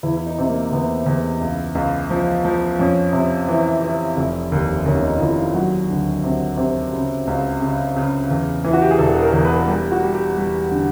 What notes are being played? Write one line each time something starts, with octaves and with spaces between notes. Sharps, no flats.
E2 E4
E4
D#4
C3
A#3
E2 B3
E2
C#2
C#2
F3
F3
F2 C#4
C3
E3
E3
F1
D#2
D#2 C#4
D#4
F4
D#2 E4
F4
F#3 F#4
D2
C3
C3
C#3
C#2
C#3
C#3
E2
E3
F#4
G4
G#4
E1 A4
A#4
E2
B4
G3 G4
F#4
G3
G4
G3
D3